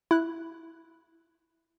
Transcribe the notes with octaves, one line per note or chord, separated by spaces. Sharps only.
E4 F#6